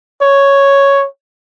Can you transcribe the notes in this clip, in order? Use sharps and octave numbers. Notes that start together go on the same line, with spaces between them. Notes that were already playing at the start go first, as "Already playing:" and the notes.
C#5